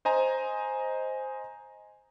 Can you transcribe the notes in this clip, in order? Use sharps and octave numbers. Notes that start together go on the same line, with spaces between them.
C5 D#5 G#5 A#5